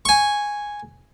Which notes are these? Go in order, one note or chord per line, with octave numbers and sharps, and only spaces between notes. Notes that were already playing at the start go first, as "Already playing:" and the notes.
G#5 C#6